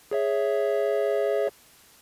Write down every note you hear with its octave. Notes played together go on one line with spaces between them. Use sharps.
G#4 C#5 E5